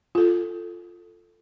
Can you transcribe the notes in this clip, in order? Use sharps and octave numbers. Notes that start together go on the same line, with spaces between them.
F4 A4